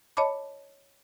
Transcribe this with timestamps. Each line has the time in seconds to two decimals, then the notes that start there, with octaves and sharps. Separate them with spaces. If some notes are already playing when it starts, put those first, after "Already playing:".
0.17 C#5 D#5 A5 B5 D6